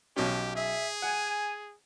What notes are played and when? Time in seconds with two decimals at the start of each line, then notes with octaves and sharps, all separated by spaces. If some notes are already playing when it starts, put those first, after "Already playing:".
0.16 B1 B2 C#4 G4
0.56 G#4 E5
1.02 F#5 G#5